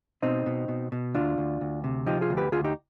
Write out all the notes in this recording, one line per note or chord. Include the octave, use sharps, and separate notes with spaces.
B2 C4 D#4
B2
B2
B2
D2 D4 F4
D2
D2
C3
F3 D#4 G4
F4 G#4
D2
G4 B4
D2 F4 G#4
D#4 G4